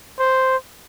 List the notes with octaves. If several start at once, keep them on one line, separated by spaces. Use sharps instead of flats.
C5